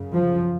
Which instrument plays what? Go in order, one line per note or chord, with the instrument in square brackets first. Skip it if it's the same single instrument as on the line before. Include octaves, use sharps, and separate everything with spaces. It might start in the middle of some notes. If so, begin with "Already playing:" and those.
Already playing: [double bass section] F#2 C#3
F3